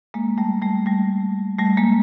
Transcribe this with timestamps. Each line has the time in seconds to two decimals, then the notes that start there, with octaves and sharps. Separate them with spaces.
0.14 G#3 A#3
0.38 G3 A3
0.62 G3 A3
0.86 G3 A3
1.59 G3 A3
1.77 G#3 A#3